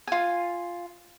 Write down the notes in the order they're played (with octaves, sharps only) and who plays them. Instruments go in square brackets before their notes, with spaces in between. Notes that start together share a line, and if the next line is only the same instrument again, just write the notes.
[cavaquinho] F4 G#5